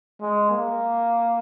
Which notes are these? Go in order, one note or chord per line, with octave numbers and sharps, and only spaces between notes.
G#3
A#3